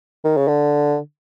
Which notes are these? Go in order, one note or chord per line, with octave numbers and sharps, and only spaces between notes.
D#3
C#3
D3